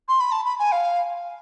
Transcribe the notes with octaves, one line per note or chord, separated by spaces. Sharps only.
C6
B5
A5
B5
G#5
F5